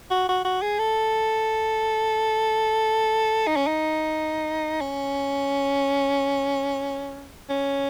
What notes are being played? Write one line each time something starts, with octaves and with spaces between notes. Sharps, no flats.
F#4
F#4
F#4
G#4
A4
D#4
C#4
D#4
C#4
C#4